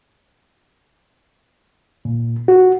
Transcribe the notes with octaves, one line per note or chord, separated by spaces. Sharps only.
A#2
F#4